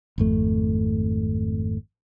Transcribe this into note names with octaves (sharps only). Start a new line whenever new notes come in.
G#1 F2 A3